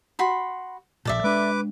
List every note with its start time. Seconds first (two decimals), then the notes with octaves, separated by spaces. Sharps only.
0.19 F#4 B5 C6
1.05 A#1 A#2 A4 D5 E5
1.24 G#3 D4 B4 D6